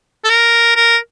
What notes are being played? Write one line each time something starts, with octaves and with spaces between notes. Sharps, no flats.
A4
A#4
A#4